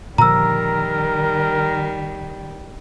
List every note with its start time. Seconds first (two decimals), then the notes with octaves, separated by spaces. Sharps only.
0.18 A#2 D3 D#3 F3 G3 A#4 A#5 E6